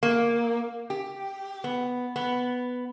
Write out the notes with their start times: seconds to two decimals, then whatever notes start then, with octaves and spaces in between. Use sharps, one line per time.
0.03 A#3
0.90 G4
1.64 B3
2.16 B3